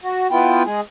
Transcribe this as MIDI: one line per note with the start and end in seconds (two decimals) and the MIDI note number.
0.01 0.27 66
0.31 0.63 59
0.31 0.63 64
0.31 0.63 65
0.31 0.63 79
0.65 0.81 56
0.65 0.81 68